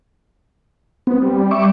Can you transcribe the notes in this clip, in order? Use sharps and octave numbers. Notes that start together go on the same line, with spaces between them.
B3 C4
G3
E5 C#6 D6